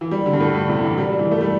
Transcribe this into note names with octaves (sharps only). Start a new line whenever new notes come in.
E3
G3
D3
G2
A2
A2
C3
E3
G3
G3
E3
A3
G3